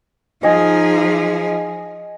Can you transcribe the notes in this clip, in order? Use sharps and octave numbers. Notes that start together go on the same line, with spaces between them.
F3 D#4 G#4 D#5 G#5